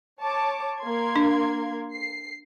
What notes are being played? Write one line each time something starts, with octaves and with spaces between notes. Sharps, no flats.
C#5 A5 D6
A#3 C6 G#6
D4
C7